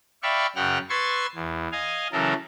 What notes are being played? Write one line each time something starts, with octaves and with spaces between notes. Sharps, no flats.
D5 E5 F5 G5 B5 C#6
F#2 C#3 F#5 G5 F6
B4 C6 C#6 E6 G#6 A6
E2
D#5 F5 G#5
C#3 E3 F#3 A4 A#4